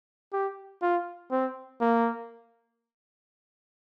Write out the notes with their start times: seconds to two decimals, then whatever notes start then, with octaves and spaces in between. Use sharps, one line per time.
0.33 G4
0.82 F4
1.32 C4
1.81 A#3